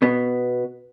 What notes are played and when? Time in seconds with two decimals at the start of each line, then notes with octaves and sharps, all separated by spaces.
0.02 B2 B3